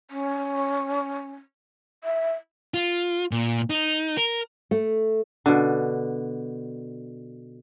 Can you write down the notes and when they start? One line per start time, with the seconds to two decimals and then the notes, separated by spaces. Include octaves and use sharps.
0.11 C#4
2.04 E5
2.74 F4
3.31 A#2
3.70 D#4
4.17 A#4
4.71 A3
5.46 B2 D3